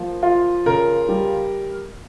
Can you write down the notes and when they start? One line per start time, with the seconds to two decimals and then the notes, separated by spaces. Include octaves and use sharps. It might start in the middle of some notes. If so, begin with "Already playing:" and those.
Already playing: F3 A#3
0.23 F4
0.66 C#3 A#4
1.09 G3